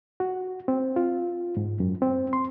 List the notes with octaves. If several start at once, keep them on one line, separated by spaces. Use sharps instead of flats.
F#4
C4
F4
G#2
F#2
C4
C6